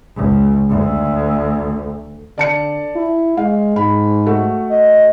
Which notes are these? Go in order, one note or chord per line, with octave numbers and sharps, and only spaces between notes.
C#2
D2
D3 D5 A5 C#7
E4
G#3 F5
G#2 B5
A3 F#4
D#5